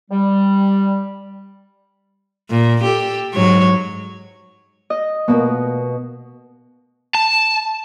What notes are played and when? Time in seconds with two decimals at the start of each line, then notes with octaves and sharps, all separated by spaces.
0.10 G3
2.51 A#2
2.83 G4 A4
3.34 G#2 F#3 C#5
4.90 D#5
5.28 B2 A3 A#3
7.15 A5